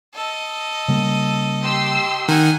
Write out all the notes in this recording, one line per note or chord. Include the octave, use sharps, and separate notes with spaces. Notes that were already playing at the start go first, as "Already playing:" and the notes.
A4 D#5
C#3 G3 A#3
G4 C6 E6
D#3 F#5 G#5